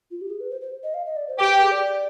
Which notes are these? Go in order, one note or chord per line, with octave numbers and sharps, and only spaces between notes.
F4
G4
G#4
B4
C5
C5
D#5
F5
D#5
D5
C5
G4 B4
B4
G#4
D5